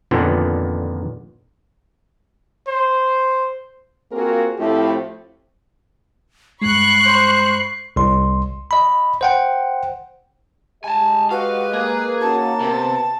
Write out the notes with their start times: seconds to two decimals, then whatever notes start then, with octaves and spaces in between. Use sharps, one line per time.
0.11 F2 A#2 D3 D#3 B3
2.67 C5
4.12 A#3 C4 F4 F#4 G#4 A#4
4.59 A2 F3 A3 C4 E4 G4
6.61 G2 G#3 B5 C#6 F#6 C7
7.05 C5
7.96 C2 C6
8.71 D#5 B5
9.21 C5 F#5 G5
10.84 G#3 G4 D#5 G#5 A5
11.31 F#4 B4 F5
11.73 A#3 G#4
12.20 C#4 D#4 F#4 A5
12.61 C3 B3 G4 C5